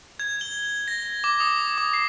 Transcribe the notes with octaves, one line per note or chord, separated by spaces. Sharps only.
G#6
G7
A#6
D6
D#6
D6
C7